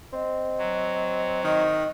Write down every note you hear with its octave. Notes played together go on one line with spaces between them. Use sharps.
C4 D#5
F#3
D#3 D#5